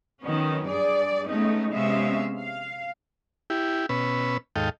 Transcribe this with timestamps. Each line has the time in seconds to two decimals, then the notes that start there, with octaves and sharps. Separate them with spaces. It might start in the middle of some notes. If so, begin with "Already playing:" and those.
0.20 D#3 F#3 B3 C#4
0.66 G2 G#4 D5
1.26 G#3 A3 B3 C#4 D#4
1.72 C3 G#3 B3 C#4 E5 F5
2.38 F5
3.50 E4 G4
3.89 B2 C#4 B4 E6
4.56 D#2 G#2 A4 D#5 F5 G5